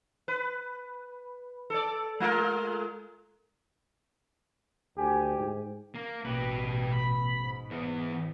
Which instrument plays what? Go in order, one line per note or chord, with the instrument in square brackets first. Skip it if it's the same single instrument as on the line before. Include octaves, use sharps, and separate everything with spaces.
[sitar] B4
A4 D5
G#3 F4 A#4
[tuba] D2 [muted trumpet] G4 [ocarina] G#5
[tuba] G#2
[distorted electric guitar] A#3
[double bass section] A1 B2 [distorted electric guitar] G4 B4
[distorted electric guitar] B5
[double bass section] G#2
[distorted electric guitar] E3 B3